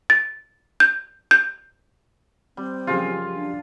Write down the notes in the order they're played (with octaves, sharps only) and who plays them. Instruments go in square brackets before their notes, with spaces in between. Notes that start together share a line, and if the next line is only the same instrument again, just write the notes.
[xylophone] A6
G6
G6
[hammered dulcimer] G3 [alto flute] C4
[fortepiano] F#2 C#3 [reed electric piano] F3 G4 [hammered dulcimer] F4
[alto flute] D4